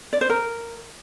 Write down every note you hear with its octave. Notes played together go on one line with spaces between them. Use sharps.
D5
C5
A#4